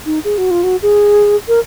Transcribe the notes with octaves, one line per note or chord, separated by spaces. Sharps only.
D#4
G#4
F#4
F4
F#4
G#4
A#4